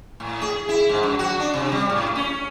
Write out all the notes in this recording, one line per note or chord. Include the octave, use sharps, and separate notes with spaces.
A2
G#4
E4
G#2
F#2
F#4
D4
C3
G3
A2
C#4